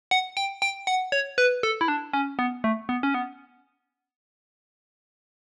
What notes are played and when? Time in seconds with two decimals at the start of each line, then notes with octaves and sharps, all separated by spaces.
0.11 F#5
0.37 G5
0.62 G5
0.87 F#5
1.12 C#5
1.38 B4
1.63 A4
1.81 E4
1.88 D4
2.13 C#4
2.39 B3
2.64 A3
2.89 B3
3.03 C#4
3.14 B3